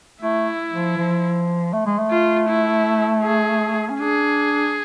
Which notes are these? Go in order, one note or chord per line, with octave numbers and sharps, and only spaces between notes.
A3 E4
F3
F3
A3
G#3
A3
F4
E4
G#4
C#4
D4 G#4